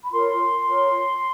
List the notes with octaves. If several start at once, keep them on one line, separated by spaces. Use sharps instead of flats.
B5
F4 A#4 C#5 C6
F4 A#4 C#5